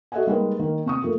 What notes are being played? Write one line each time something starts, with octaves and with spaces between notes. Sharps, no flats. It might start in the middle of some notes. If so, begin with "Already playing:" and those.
F#4 A4 D#5 E5 F#5 G#5
G3 G#3 A#3 D#4 A#4 B4
D#3 A#3
C3 C#6 D#6
F3 A3 A#3 F4